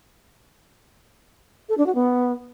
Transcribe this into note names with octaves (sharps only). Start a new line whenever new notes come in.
A4
D4
F#4
B3